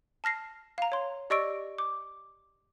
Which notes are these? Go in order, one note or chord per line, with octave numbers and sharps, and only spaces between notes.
A5 F6 A#6 C7
F5 A#5
C#5 C6
G4 D5 D#5 C#6 E6 D7
D6